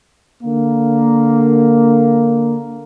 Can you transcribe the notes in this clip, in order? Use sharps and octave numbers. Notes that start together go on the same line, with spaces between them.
D3 A#3